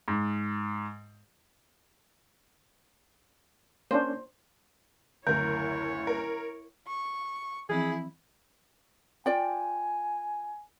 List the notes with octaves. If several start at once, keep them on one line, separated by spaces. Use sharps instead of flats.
G#2
A#3 C#4 D4 C5
F#1 D2 E4 A#4 C#5 G6
A#4
C#6
E3 F3 C4 E4 G#4
F4 D5 G5 G#5